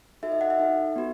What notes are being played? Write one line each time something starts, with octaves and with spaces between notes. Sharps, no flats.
D#4 F#4 A4 E5
D#5
F#5
E5
D#4 A4
B3 F#4